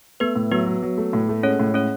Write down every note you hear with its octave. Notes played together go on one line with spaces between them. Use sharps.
A3 B3 B4
A2
F#3 B3 B4
F#3
F#3
A3
A2
A3
G#3 C#4 C#5
A2
G#3 C#4 C#5